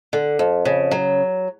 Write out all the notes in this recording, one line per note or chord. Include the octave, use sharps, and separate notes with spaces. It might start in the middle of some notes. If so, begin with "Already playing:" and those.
D3
F2
C#3
F#3